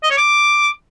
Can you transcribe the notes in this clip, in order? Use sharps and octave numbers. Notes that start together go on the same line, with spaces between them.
D#5
C#5
D6